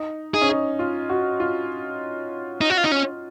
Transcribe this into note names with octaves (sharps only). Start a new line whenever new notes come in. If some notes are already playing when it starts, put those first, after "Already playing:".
Already playing: D#4
D#4 G#4
C#4
D#4
F4
F#4
F4
D#4
F#4
F4
D#4
C#4